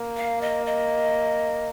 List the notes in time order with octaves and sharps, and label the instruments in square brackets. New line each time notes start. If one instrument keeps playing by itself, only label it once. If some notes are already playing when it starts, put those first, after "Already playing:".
Already playing: [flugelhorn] A#3
[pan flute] F5
D#5
D#5